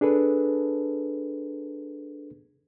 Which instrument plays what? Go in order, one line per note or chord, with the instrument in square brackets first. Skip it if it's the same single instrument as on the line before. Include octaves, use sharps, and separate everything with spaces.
[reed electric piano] D4 G#4 A4 B4